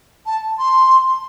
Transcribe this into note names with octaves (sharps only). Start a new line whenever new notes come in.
A5
C6